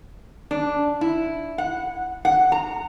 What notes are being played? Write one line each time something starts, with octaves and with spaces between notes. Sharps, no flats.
D4
E4
F#5
F#5
A#5